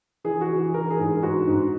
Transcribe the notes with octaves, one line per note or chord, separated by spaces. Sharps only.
E3 G#4
F#4
E3
G#4
E3 A#4
G#4
G#2
G#4
G#2 F#4
G#2